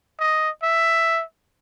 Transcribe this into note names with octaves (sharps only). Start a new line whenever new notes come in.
D#5
E5